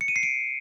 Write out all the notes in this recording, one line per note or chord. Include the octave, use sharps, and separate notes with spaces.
C#7
D#7
C7
D7